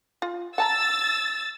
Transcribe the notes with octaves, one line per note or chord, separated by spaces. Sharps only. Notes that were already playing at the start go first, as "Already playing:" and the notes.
F4
F#5 A5 A#5 E6 A6